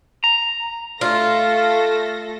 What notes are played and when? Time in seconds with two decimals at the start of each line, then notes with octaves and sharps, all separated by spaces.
0.24 A#5
1.01 A3 F4 A4 F5 A#6